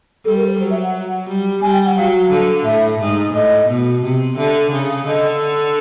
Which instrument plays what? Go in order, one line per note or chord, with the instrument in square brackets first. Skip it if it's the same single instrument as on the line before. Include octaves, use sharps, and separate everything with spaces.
[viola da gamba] G3 [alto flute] A4
[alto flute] A#4
C5
[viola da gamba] F#3 [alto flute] C5
[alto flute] E5
F#5
[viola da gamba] G3
[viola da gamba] G3 [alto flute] G#5
[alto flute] G5
F#5
[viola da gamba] F#3 [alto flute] F5
[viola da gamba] D3
[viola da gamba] A2 [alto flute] E5
[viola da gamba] G#2
[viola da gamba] A2 [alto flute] D#5
[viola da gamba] B2
C3
[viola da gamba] D3 [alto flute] E5
[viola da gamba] C#3
[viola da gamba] D3 [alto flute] D#5